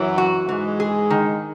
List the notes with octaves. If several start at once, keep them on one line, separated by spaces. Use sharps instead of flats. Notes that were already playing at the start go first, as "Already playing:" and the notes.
Already playing: F#2 E3 F#3
F#4
G#2 E3 G#3
G#4
D#3